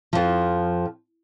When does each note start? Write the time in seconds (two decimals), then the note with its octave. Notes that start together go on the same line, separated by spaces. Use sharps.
0.13 F2 F3